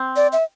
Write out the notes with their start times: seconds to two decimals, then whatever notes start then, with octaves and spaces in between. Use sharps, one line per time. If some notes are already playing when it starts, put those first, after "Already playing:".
Already playing: C4
0.16 D5
0.33 E5